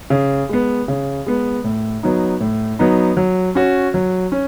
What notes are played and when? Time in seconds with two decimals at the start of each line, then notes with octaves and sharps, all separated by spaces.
0.10 C#3
0.49 G#3 B3
0.88 C#3
1.26 G#3 B3
1.64 A2
2.03 F#3 B3 D#4
2.41 A2
2.79 F#3 B3 D#4
3.17 F#3
3.55 C#4 F#4
3.94 F#3
4.32 C#4